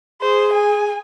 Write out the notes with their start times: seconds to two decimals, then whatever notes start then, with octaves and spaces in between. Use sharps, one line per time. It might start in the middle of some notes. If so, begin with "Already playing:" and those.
0.21 G#4 C5
0.53 G#5